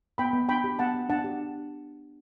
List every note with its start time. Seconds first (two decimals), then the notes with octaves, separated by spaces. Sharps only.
0.18 B3 G5 B5
0.33 B3
0.49 D4 G5 B5
0.64 G4
0.79 B3 F#5 A5
0.94 B3
1.09 D4 F#5 A5
1.24 G4